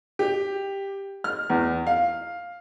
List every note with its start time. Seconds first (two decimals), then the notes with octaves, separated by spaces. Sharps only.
0.19 G4
1.24 F6
1.50 E2
1.87 F5